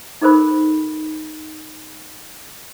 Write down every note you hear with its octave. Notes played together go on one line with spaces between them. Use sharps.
D#4 A4 A#4 C5 B5